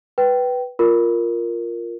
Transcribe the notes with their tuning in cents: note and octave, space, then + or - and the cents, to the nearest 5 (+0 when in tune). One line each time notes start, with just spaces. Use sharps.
B4 +0 G5 -15
F4 +0 A#4 +0